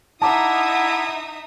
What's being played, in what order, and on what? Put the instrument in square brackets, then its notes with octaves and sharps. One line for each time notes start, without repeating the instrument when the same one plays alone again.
[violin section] D#4 E5 D#6 [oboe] E4 [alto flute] F#5 [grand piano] A5 A#5 D6